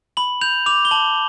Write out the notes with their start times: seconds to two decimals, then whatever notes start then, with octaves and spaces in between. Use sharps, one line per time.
0.17 B5 F#7
0.41 G6 F7
0.66 D6 F7
0.85 G7
0.91 A5 F#7